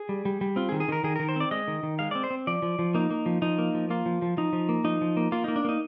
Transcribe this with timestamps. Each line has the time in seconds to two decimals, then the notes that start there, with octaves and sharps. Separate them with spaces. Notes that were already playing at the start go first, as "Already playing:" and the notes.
Already playing: G#4
0.09 G3
0.25 G3
0.41 G3
0.56 C4 F4
0.69 G#4
0.72 D#3
0.80 G#4
0.89 D#3 A#4
1.04 D#3 G#4
1.16 D#3 A#4
1.29 C5
1.36 C4 D5
1.51 G#3 D#5
1.68 D#3
1.83 D#3
1.99 G#3 F5
2.11 C4 D5
2.24 C5
2.31 C4
2.47 F3 D5
2.62 F3
2.79 F3
2.94 A#3 D#4
3.11 A#3
3.26 F3
3.42 F3 D#4
3.58 A#3
3.75 F3
3.90 A#3 F4
4.06 F3
4.22 F3
4.37 F3 D#4
4.53 F3
4.69 A#3
4.84 F3 D#4
5.01 F3
5.17 A#3
5.32 A#3 F4
5.44 A#3 D#4
5.56 D4
5.65 A#3 D#4